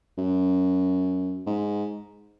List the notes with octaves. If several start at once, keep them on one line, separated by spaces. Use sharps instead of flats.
F#2
G#2